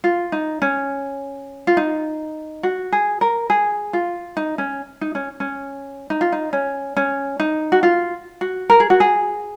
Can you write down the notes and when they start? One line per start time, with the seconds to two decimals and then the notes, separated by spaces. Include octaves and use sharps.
0.04 F4
0.32 D#4
0.62 C#4
1.67 F4
1.77 D#4
2.63 F#4
2.92 G#4
3.21 A#4
3.50 G#4
3.93 F4
4.37 D#4
4.58 C#4
5.01 D#4
5.15 C#4
5.40 C#4
6.10 D#4
6.21 F4
6.32 D#4
6.53 C#4
6.97 C#4
7.40 D#4
7.72 F#4
7.83 F4
8.41 F#4
8.70 A#4
8.80 G#4
8.90 F#4
9.00 G#4